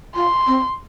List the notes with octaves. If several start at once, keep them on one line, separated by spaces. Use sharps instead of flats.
F4 C6
C4